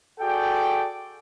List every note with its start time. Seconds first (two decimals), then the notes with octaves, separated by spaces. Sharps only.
0.20 F#4 G#4 A4 D5 G5